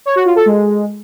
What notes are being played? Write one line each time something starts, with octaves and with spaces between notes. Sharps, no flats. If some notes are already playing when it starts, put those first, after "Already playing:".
C#5
F#4
F4
A4
G#3